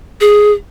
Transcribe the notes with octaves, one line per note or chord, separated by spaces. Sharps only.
G#4